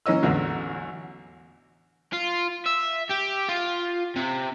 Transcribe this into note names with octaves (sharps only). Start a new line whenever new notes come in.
E3 A#3 C#4 D#5 E6
A1 E2 D3 F#3
F4
E5
G4
F4
C3